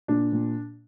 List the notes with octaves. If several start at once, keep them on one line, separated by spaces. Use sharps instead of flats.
A#2 D4
A#2